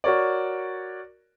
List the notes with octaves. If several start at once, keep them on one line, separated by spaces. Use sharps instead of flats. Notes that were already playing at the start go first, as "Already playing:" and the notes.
F#4 A#4 C#5 D5